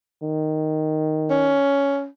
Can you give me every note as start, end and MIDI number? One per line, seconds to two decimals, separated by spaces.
0.22 1.61 51
1.30 2.06 61